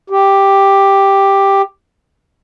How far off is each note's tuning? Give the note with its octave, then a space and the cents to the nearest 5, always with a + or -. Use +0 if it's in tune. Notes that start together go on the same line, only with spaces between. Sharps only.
G4 +5